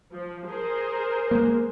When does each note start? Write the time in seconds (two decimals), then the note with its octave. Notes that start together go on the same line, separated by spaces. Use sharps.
0.12 F3
0.48 G#4 A#4 C5
1.31 G#3 A#3